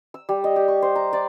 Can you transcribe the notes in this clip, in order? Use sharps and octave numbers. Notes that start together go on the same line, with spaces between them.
E6
G3
D#5
G4
C#6
C5
A#5
D5